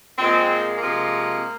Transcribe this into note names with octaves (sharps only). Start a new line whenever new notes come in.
A#2 G#3 C4
C3 F3 G#3 A#3